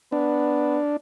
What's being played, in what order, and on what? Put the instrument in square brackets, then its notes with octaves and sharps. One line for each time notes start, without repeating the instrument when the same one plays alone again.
[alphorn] B3 [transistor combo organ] D4